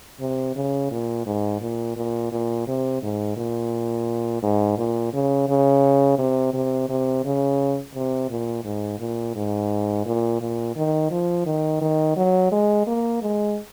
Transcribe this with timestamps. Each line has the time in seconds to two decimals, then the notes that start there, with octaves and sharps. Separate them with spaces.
0.20 C3
0.56 C#3
0.91 A#2
1.26 G#2
1.61 A#2
1.97 A#2
2.32 A#2
2.67 C3
3.03 G#2
3.37 A#2
4.43 G#2
4.78 A#2
5.13 C#3
5.48 C#3
6.18 C3
6.54 C3
6.89 C3
7.24 C#3
7.95 C3
8.30 A#2
8.64 G#2
9.00 A#2
9.35 G#2
10.06 A#2
10.41 A#2
10.76 D#3
11.11 F3
11.46 D#3
11.81 D#3
12.17 F#3
12.52 G#3
12.87 A#3
13.22 G#3